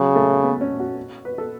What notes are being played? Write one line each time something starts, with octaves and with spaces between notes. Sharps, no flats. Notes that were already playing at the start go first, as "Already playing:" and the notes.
Already playing: C#3 F#3
A3
B3
C#4
F#4
B4
A4